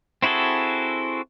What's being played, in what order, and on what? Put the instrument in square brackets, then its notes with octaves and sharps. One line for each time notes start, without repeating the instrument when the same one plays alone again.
[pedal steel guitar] C4 E4 F#4 G#4 A4